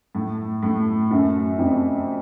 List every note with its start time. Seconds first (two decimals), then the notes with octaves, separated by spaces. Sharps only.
0.15 A2
0.62 A2
1.11 F#2
1.58 F2